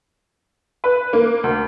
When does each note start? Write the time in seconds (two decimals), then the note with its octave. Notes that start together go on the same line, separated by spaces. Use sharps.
0.84 B4
1.13 A#3
1.44 D2